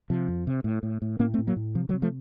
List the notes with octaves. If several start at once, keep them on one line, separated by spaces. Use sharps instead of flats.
C3 F3
F2
C3
A2
A2
A2
A2 A#3 C#4
A3 C4
A2
F#3 A#3
A2
C3 F3
D#3 F#3
C3
F3 A3